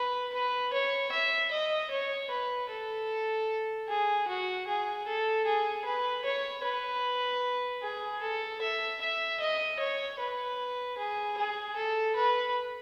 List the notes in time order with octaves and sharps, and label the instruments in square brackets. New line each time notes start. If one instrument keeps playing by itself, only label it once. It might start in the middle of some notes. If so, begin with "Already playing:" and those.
Already playing: [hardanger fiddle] B4
B4
C#5
E5
D#5
C#5
B4
A4
G#4
F#4
G#4
A4
G#4
B4
C#5
B4
G#4
A4
E5
E5
D#5
C#5
B4
G#4
G#4
A4
B4